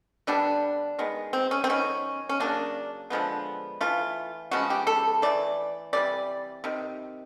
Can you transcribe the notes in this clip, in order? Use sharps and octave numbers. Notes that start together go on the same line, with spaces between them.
D3 G3 B3 D4
D#3 G#3 B3
C4
C#4
C4
D#3 F#3 B3 C#4
C#4
C#3 F#3 A#3 D4
D3 F3 G#3 B3
E3 A3 F4
C#3 F3 G#3 B3 F#4
G4
A4
E3 A3 D5
C3 E3 G3 D5
C3 D#3